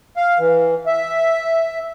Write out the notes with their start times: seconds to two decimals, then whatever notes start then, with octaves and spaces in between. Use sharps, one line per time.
0.16 F5
0.39 E3
0.86 E5